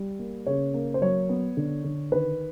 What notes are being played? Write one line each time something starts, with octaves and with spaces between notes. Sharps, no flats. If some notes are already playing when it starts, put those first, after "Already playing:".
Already playing: G3
A#3
C#3 C#5
A#3
C5
F#3 C#5
B3
D3
D3
D#3 B4